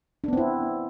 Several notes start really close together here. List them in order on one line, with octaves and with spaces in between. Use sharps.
D4 B3 C4 E4